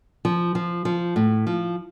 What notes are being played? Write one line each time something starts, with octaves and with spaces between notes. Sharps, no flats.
F3
F3
F3
A2
F3